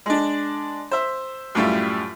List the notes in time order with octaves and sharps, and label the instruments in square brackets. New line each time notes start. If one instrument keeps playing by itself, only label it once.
[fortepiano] G#3 D4
C5 E5
F#2 A2 G3 E4 F4